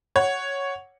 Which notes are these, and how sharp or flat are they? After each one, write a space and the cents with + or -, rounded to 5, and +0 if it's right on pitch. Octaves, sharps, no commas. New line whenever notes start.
C#5 +0 F#5 +0